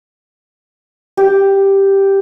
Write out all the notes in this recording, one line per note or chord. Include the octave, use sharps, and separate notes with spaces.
G4